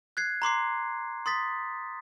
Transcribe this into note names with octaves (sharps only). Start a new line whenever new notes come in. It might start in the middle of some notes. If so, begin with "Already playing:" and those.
F#6 G#6 C7
A#5 C6 D6 C7
C6 D#6 A6 B6